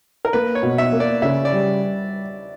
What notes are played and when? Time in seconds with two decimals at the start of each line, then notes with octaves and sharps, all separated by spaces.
0.25 A#4
0.33 A#3 B4
0.55 C#5
0.63 B2
0.78 E5
0.92 A#3
1.00 D5
1.22 C#3 E5
1.45 D5
1.52 G3